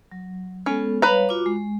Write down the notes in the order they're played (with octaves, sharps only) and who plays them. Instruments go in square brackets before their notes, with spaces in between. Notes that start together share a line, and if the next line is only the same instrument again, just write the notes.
[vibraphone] F#3
[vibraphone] G#3 B3 A4 [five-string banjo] C#4
[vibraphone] G3 C#5 F5 [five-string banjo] B4 A#5
[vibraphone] F4 F#4 D6
G#3